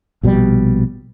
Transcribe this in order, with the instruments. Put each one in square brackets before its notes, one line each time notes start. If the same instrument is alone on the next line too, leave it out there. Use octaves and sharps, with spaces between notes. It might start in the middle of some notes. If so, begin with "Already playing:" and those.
[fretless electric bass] A#1 B2 F3 G3